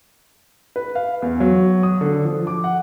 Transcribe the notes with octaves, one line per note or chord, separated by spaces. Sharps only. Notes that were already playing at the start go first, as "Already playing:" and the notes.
B4
F5
E2
F#3
D#6
D3
F3
D6
F#5